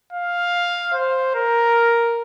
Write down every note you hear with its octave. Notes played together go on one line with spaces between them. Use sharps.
F5
C5
A#4